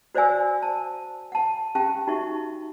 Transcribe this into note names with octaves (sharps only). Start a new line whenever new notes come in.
F#4 C5 D5 F5 G#5 E6
A5
F#5 A5
C#4 G4 F5 G5 A5
D#4 F#4 G4 E5 C#6